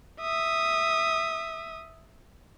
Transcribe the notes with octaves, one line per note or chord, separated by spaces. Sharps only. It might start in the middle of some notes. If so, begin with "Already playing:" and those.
E5 D#6